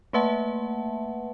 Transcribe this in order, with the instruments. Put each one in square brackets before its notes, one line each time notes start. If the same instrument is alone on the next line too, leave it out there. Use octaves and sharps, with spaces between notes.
[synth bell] A3 A#3 B4 E5 F#5 A5